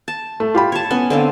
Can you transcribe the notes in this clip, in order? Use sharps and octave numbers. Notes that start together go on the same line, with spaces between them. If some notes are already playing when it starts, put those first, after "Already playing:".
A5
A3
F4 G4 B5
C#5 A5
B3 C#4
D3 C4 F5